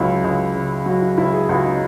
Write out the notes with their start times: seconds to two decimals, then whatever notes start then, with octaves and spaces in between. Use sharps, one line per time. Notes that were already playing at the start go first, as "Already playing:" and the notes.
Already playing: C#2 F#3 E4
0.24 C#2
0.55 C#3
0.86 F#3 F#4
1.02 E4
1.18 C#2 E4
1.34 G#4
1.49 C#2 F#4
1.64 D#4